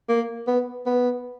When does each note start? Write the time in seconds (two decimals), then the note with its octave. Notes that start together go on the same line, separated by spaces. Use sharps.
0.09 A#3
0.47 B3
0.86 B3